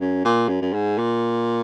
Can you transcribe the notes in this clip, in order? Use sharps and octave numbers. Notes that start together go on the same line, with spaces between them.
F#2
A#2
F#2
F#2
G#2
A#2